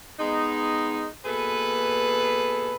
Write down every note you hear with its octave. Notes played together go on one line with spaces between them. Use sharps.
G#3 B3 D#4
B2 A#3 G#4 A4 B4